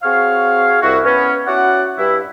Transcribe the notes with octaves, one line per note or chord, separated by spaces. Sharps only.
C4 F#4 G#4 C#5 F5
C2 E4 F#4
B3 C#4
C#4 E4 F#4 D5 F#5
G2 E4